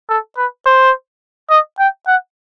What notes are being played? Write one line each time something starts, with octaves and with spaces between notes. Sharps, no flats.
A4
B4
C5
D#5
G5
F#5